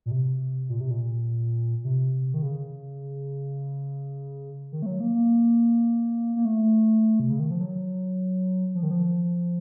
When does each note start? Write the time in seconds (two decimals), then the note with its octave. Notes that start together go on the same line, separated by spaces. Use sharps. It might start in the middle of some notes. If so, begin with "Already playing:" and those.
0.06 A#2
0.11 C3
0.69 A#2
0.81 C3
0.91 A#2
1.85 C3
2.34 D#3
2.43 C#3
4.72 D#3
4.82 A3
4.86 F#3
5.00 A#3
5.15 A#3
6.36 A#3
6.45 A3
7.20 C3
7.30 C#3
7.40 D#3
7.51 F3
7.61 F#3
8.75 F3
8.83 D#3
8.91 F3
9.03 F3